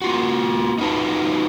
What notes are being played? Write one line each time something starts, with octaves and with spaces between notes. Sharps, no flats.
A#3 F4 F#4
D#4 F4 F#4 B4 D#5 A5